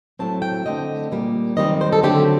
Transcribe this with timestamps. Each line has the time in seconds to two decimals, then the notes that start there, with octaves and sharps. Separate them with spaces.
0.19 A2 F#3 C4 A5
0.42 G5
0.66 D3 A3 C4 D#5
1.11 A#2 G3 A#3
1.57 F#2 D#3 G3 C4 D#5
1.81 C5
1.93 A4
2.03 D3 F#3 A3 C4 G4